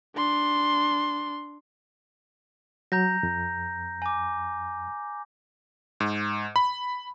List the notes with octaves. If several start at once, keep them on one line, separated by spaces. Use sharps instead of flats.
D4 C6
F#3 A#5 G6 A#6
F2
G#5 D6
G#2
B5